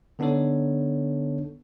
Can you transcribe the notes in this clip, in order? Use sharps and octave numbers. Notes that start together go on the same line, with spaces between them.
D3 B3 D4 D#4 A4 C#5